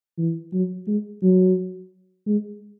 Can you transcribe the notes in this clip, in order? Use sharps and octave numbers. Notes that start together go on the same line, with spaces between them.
E3
F#3
G#3
F#3
G#3